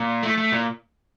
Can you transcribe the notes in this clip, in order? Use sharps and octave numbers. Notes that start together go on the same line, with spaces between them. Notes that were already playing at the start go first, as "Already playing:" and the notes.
Already playing: A#2
A3
A3
A#2